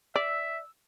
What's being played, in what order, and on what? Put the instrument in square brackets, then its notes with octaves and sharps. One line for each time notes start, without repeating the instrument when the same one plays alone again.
[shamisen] D5 [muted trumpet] E5 [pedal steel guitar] E6